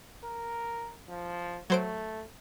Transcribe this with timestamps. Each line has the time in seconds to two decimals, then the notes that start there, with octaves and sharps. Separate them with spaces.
0.24 A#4
1.09 F3
1.70 F#3 A3 C5 D7